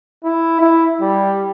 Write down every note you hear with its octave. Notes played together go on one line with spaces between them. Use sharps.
E4
E4
G3